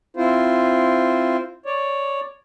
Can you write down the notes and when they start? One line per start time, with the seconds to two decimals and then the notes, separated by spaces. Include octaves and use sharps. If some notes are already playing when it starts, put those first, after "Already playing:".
0.17 C4 E4 F4 C5
1.66 C#5 D5